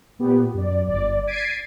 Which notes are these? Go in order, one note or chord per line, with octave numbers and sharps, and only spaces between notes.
A#2 B3 G4
F#2 D5
G1 D5
G#6 A6 B6 C7 D7 D#7